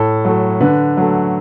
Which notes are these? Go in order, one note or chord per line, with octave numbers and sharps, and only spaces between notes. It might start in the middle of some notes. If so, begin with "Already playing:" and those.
Already playing: A2 A4
F#3 A3
D3 B4
F#3 A3